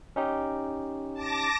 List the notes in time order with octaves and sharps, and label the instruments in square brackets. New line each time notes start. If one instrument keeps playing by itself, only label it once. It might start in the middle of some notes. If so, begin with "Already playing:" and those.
[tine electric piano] C#4 D#4 G4
[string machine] A5 D6 A#6